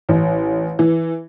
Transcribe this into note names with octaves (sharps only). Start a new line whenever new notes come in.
A1
E3